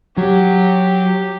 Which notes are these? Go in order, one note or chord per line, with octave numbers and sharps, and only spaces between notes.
F#3 G4